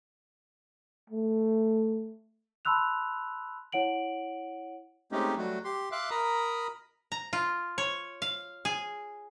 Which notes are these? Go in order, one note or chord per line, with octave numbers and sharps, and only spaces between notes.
A3
A5 B5 C6 E6 F#6 F7
E4 C#5 F#5 D7 F#7
G#3 A3 C4 C#4 D#4 G4
F#3 G3 A3 F#4
G4 C6
E5 F5 C6 D6 F#6
A#4 A#5 B5 D#6
A#5
F4
C#5
F5
G#4